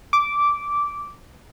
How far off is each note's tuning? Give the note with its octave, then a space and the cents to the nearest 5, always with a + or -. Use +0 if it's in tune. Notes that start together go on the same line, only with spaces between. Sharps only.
D6 -10